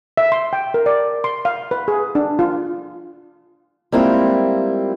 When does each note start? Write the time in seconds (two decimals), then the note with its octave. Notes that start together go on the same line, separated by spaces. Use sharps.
0.17 E5
0.32 C6
0.53 G5
0.74 A#4
0.86 D5
1.24 C6
1.45 F5
1.71 B4
1.88 G#4
2.15 D4
2.39 F4
3.92 G3 G#3 A#3 C4 E4 F4